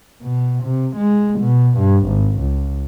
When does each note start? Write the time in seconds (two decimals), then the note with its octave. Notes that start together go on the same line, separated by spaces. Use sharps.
0.21 B2
0.63 C3
0.97 G#3
1.40 B2
1.79 G2
2.07 G#1
2.40 C#2